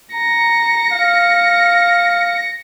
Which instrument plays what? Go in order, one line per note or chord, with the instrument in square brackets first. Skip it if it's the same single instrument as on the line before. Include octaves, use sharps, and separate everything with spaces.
[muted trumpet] A#5 [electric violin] A#6 C#7
[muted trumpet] F5